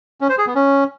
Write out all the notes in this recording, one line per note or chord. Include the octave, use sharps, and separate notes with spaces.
C#4
C5
G#4
B3
C#4